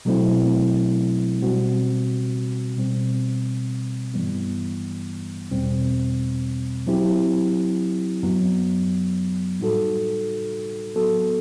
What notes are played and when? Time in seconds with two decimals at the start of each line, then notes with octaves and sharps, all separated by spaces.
0.05 B2 F#3 A3 C4 E4
1.42 B2 G3 C4 F#4
2.77 B2 G3 C4
4.14 G2 E3 G3 B3
5.50 E2 B2 G3 C4
6.87 F#3 C4 E4 G4
8.23 F#2 F#3 B3
9.60 A2 G3 D#4 F#4 A4
10.96 F#3 B3 F#4 A4